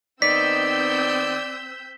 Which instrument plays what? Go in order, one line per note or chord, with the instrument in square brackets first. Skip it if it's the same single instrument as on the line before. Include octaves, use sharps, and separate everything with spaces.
[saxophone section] D#3 B3 D#4 [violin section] C4 E6 G6 [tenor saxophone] D5 [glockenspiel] B6